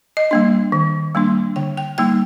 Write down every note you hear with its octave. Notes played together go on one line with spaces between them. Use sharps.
D#5
G3 A#3 D4
D#3
G3 A#3 D4
D3 G5
G5
G3 A#3 D#4 G5